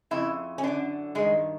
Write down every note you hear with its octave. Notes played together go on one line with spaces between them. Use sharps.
F2 C#3 E4
C#4
F#2 D3 D4
G2 D#3 G#3